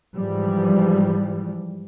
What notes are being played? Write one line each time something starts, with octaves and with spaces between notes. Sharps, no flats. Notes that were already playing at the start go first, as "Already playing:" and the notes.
G#2 E3 F3 G3